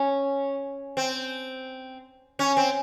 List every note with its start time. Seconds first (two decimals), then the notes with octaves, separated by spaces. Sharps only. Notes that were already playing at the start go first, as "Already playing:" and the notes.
Already playing: C#4
0.97 C4
2.39 C#4
2.57 C4